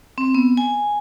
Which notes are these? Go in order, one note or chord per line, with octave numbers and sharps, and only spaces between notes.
C4
B3
G#5